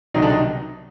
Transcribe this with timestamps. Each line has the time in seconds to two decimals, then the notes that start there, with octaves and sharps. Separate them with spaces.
0.14 C2 B2 D#3 F#3 D#4
0.22 D3 D4
0.30 D#3 D#4